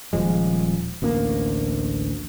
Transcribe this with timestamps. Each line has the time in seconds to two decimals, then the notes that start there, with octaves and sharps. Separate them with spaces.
0.13 D#1 F3 G#3
1.02 A1 D2 A#3